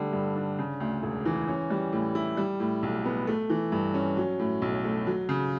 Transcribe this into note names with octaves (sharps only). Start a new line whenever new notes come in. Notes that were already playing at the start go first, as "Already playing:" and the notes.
Already playing: D3 G3 A3
G2
D4
C#3
D2
E1
E3
C#4
G3
A2
E4
G3
A2
B1
B3
A3
E3
G2
C#4
F#3
A2
B1
A3
F#3
C#3